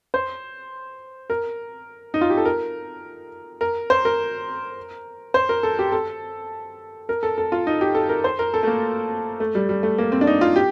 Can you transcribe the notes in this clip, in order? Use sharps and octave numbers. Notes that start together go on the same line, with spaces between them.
C5
A#4
D#4
F4
G4
A4
A#4
A#4
C5
A#4
C5
A#4
A4
G4
A4
A#4
A4
A4
F4
D#4
G4
A4
A#4
C5
A#4
A4
A3
A#3
A3
G3
G3
A3
A#3
C4
D4
D#4
F4
G4